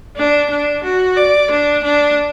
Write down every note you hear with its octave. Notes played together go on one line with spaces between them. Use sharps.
D4
D4
F#4
D5
D4
D4